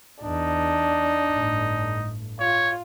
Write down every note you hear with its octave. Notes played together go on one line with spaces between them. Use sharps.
E2 D4 D#4
G1 A2
F4 C#5